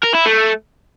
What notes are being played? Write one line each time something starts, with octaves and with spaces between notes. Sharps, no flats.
A#4
E4
A3